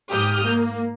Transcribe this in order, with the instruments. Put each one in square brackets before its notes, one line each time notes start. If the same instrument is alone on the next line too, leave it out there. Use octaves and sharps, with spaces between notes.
[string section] G#2 G4 D#6 F6 G6
A#3